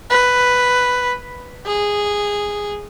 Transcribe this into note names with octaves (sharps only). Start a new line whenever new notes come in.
B4
G#4